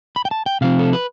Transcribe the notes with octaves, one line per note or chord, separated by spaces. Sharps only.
B5
G5
A5
G5
C3 F3 C4 F5
A4
B4